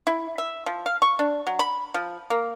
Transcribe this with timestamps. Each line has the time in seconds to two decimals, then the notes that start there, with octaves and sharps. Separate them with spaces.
0.07 E4
0.38 E5
0.66 F3
0.86 F5
1.02 C#6
1.19 D4
1.47 F#3
1.59 B5
1.94 F3
2.30 A#3